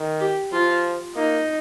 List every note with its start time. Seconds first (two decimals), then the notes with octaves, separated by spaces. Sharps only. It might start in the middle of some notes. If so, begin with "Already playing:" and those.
Already playing: D#3
0.20 G4
0.52 F3 F4
1.15 A#3 D#4